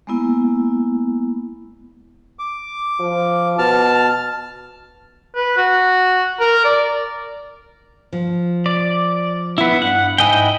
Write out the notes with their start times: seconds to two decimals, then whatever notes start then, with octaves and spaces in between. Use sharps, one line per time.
0.07 G#3 A#3 B3 E4
2.39 D6
3.00 F3
3.58 B2 A5 F6
5.36 B4
5.57 F#4
6.40 A#4
6.65 D5
8.13 F3
8.66 D5
9.58 B3 E4
9.82 G2 F#5
10.18 G#2 E4 D#5 G5 G#5